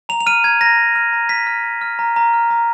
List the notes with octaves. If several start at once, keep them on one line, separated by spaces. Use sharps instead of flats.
A#5 F7
F7
F6 D#7
A#5 G#6
A#5 A#6
A#5
F6
A#5
F6 B6
F6
F6
F6
A#5
A#5
F6
A#5